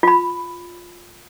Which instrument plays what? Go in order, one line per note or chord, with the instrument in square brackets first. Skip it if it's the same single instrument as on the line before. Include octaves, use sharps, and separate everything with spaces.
[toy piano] F4 B5